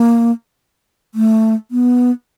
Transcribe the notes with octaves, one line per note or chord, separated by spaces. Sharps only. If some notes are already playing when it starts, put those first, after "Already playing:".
Already playing: A#3
A3
B3